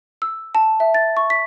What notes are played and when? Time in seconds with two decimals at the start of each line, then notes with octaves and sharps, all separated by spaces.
0.22 E6
0.55 A5
0.80 E5
0.94 A6
1.17 C#6
1.30 B6